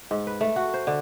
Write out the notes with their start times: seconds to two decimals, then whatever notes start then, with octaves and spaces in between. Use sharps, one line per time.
0.11 G#2
0.27 B4
0.41 A3
0.56 F#4
0.74 C5
0.87 D3